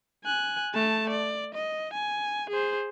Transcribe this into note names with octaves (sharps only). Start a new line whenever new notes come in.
G#5 F#6
A3 A5
D5
D#5
G#5
G#4 C5